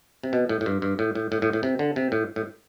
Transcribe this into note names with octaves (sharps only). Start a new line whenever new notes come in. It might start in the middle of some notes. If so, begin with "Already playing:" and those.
C3
B2
A2
A2
G2
G2
A2
A2
A2
A2
A2
C3
D3
C3
A2
A2